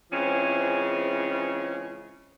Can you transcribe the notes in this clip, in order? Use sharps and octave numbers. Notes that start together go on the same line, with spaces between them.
C#3 E3 F3 G#3 C4 C#4